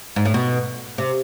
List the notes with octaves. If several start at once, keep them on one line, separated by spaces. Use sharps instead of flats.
G#2
A2
B2
C3